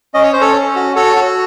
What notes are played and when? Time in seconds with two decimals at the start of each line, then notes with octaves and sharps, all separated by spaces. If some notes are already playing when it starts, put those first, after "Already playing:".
0.14 C#4 D#5
0.23 C#5
0.33 C#4 C5
0.41 A4 C#5
0.55 C#4
0.76 F#4
0.96 F#4 A4 C#5
1.16 F#4